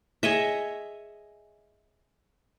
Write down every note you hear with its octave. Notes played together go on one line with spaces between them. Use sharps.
G#4 C#5 D#5 E5